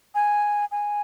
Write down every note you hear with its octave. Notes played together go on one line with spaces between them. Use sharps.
G#5
G#5